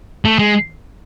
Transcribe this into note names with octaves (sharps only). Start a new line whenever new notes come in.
A3
G#3